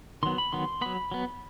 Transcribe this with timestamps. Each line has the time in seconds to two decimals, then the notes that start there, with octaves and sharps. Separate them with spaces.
0.23 D#3 F#3 B3 C6
0.38 B5
0.53 D#3 F#3 B3 C6
0.81 F#3 B3 B5
1.11 F#3 B3